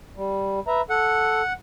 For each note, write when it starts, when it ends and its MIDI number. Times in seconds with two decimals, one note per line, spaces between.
0.17 0.60 55
0.67 0.81 71
0.67 0.81 76
0.67 0.81 82
0.90 1.42 69
0.90 1.53 78